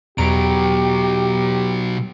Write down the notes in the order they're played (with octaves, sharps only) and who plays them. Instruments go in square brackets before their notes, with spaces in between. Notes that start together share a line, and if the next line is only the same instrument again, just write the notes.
[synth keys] E2 A#5 D7 [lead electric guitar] B2 F#3 [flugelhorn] G4